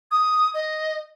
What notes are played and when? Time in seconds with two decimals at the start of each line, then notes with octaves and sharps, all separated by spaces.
0.11 D#6
0.54 D#5